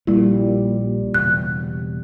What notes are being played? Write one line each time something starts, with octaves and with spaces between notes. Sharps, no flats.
A#1 A#2 G3 E4
E1 C#3 F#6